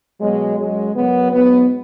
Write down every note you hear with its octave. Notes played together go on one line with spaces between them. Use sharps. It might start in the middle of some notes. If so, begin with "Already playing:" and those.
B2 F#3 G#3
F#2 F#3 G#3
F#2 C#3 F#3 B3
G#2 F#3 B3